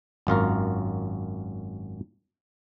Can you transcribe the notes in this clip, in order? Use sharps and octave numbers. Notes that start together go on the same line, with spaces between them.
G#1 F#2 F4 A#4